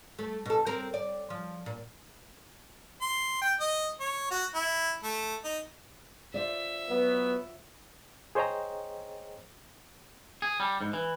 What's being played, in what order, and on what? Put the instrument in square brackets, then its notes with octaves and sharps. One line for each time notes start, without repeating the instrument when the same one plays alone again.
[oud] A3
B2 A4
C4 A#4
D5
F3
A#2
[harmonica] C6
G5
D#5
C#5
F#4
E4
A3
D#4
[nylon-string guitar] F4 C5 D5 [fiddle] E5
[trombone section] F#3 B3
[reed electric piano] G#4 C5 C#5 D#5 G5 A#5
[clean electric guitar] G#4
G3
G#2
E3